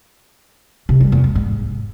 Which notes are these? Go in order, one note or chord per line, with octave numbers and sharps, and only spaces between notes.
C3
G3
E2
G#3
G#2